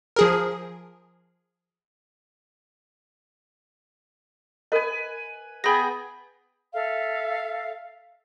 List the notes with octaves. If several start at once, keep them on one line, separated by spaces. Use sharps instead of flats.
F3 G#4 A#4
A#4 B4 D#5 G#5
B3 G#4 G5 B5 A#6
A4 E5 F5